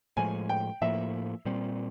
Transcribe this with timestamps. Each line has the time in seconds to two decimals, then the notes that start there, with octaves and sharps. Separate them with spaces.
0.17 A2 F3 G#3 G#5
0.49 G5
0.82 A2 F3 A#3 E5
1.45 A#2 G3 C4